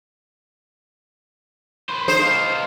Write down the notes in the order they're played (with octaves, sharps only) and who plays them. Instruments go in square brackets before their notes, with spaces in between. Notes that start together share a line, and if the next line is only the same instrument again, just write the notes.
[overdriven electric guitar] B4 C5
[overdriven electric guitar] D#4 [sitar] C5
[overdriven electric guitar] G#3 F5